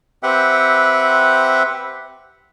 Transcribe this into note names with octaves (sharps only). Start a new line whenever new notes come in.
C4 G4 B4 E5 F#5 G5